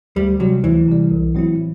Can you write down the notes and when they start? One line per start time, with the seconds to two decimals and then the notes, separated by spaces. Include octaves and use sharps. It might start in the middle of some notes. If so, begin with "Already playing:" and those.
0.16 D2 G3
0.40 C3 F#3 G3
0.64 D2 E3
0.88 C3 G3
1.11 B1
1.34 A2 F#3 C4 E4